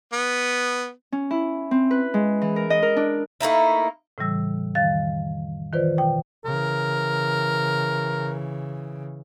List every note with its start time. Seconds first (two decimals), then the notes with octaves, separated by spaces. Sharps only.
0.13 B3
1.12 C#4
1.31 E4
1.71 C4
1.91 B4
2.14 G#3
2.42 E3
2.56 A#4
2.70 D#5
2.82 A#4
2.96 D4
3.41 A3 A#3 D#4 E4
4.18 A2 C#3 E3 G3 E6
4.75 F2 D#3 G3 F5 A6
5.72 D#3 E3 F4 B4 C5 D5
5.98 B2 G5
6.45 C#3 E3 A#4